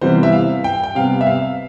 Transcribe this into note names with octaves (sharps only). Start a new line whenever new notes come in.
C3 E3 G3 B3 C5
E5
F5
G5
G5
C3 G3 B3 F5
E5
F5